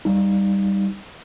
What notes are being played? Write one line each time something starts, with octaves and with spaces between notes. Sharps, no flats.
G3 D#4